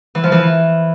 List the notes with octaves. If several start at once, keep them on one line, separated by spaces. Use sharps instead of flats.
E3
F3
E3